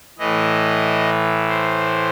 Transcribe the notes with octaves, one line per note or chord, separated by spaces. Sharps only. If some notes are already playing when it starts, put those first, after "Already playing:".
A2 E3 D#5
C5